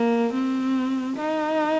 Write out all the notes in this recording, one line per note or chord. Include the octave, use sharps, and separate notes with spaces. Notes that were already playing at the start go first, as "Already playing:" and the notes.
Already playing: A#3
C4
D#4